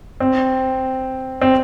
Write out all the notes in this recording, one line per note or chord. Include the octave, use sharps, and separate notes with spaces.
C4
C4